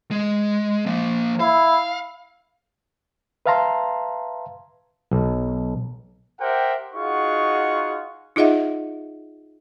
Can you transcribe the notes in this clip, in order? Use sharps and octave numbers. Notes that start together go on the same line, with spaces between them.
G#3
F3 A#3
E4 F5
B4 E5 F5 A5 A#5 C6
B1
G4 A#4 C5 E5 F#5 G5
D#4 F4 F#4 G#4 F#5 C#6
D#4 F4 G#4 D#5 E5 F#5